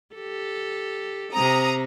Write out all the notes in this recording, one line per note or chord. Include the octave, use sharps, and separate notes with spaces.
G4 A4
C3 C4 A#5 D#6